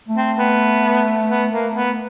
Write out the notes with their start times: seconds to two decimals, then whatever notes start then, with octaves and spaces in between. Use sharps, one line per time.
0.08 A3
0.17 C4
0.38 B3
1.30 B3
1.52 A#3
1.75 B3